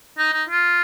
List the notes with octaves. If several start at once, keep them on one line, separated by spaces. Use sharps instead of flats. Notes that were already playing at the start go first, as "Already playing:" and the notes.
D#4
D#4
F4